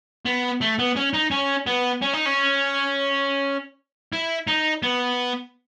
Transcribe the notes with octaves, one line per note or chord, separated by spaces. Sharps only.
B3
A3
B3
C#4
D#4
C#4
B3
C#4
D#4
C#4
E4
D#4
B3